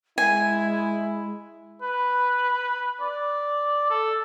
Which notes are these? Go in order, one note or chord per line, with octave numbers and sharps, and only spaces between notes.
G#3 E4 G#5
B4
D5
A4